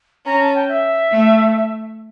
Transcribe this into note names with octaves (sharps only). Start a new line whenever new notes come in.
C#4 A#5
A5
G5
E5
A3